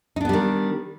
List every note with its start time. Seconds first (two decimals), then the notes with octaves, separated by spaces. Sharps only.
0.16 D#4
0.21 D4
0.25 B3
0.29 G3
0.33 D#3